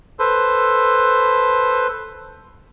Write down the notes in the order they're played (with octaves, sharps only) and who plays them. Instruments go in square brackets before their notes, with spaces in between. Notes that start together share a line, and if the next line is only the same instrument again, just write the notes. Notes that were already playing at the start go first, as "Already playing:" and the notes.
[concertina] A4 B4 C5